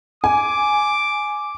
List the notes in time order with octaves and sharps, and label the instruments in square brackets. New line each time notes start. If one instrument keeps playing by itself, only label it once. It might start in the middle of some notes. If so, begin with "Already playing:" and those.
[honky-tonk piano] G#5 [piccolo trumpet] D6